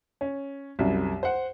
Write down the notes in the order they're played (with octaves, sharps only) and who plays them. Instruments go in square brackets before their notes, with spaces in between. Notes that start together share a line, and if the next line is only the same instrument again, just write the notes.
[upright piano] C#4
C2 F#2
C5 F#5